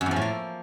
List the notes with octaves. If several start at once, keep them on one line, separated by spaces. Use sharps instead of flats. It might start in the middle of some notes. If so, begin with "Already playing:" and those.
F#2
E2
F3
A2
A#3